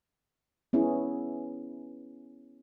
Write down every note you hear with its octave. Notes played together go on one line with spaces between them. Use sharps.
B3 C#4 E4 G#4